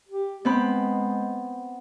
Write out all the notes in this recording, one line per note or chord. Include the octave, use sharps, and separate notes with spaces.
G4
G#3 B3 C4 B5